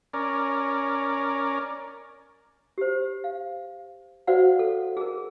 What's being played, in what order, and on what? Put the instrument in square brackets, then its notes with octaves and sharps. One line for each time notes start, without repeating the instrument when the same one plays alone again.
[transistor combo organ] C#4 A#4 D5
[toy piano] G4 C5
F5
F#4 B4 C5 D5 F5 F#5
A4
G#4 A#4